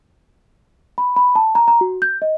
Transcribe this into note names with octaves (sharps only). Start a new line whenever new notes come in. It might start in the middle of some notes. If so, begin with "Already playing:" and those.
B5
B5
A5
A#5
A#5
F#4
G6
D#5